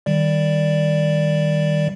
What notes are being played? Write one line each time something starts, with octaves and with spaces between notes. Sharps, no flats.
D#3 G3 D5